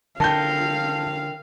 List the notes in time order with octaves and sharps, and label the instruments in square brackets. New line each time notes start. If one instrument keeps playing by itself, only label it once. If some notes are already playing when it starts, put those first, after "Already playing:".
[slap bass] D3 [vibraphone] A#4 G5 [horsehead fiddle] F5 [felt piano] A5 G6